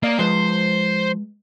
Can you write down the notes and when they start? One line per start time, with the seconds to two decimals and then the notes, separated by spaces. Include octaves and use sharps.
0.03 A#3 D5 D#5
0.19 F3 G#3 B4 C5